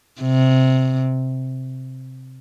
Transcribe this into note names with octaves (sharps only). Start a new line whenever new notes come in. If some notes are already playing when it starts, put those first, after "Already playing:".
C3